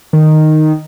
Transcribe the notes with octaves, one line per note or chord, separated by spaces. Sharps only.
D#3